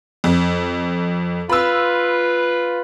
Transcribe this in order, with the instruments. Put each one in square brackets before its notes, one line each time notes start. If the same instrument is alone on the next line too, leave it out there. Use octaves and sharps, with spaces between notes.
[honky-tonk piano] F2
[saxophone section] F4 B4 [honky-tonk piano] B5 E6